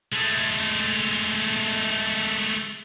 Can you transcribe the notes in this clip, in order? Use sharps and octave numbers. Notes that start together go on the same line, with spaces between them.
G#3 A3